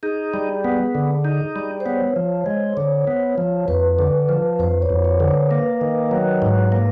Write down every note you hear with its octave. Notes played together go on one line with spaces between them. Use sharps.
D#4 G#4
G3
B3
D3
D#4
G3
C5
B3 C#5
F3
G#3
D3 C#5
B3
F3
F2 B4
D3
F3
F2 C5
C#5
F2
C#5
D3
C5
A#3 B4
D#3
F#3
G#2
A#3